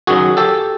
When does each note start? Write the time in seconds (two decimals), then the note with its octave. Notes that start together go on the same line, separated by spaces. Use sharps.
0.07 F#2 D#3 F#3 F#4 G#4
0.37 G4 A4